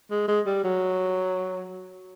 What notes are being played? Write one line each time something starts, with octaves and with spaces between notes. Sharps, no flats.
G#3
G#3
G3
F#3